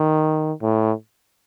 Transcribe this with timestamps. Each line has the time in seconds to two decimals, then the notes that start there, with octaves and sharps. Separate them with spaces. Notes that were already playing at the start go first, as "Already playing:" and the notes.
Already playing: D#3
0.62 A2